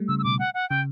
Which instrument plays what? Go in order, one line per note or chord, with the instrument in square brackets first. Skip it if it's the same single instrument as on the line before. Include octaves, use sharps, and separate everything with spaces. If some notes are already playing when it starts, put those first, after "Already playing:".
Already playing: [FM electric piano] G3 A3
[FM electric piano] C#3 [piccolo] E6
[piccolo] E6
[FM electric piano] B2 [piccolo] D6
[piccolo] F#5
F#5
[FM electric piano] C#3 [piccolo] G5